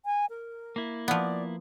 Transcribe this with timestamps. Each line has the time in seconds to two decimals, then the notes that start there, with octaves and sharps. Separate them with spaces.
0.05 G#5
0.30 A#4
0.76 A#3 E4
1.08 F3 B3 D5